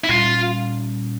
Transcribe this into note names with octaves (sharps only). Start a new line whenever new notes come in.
E4
A#2 G3 C#4 F4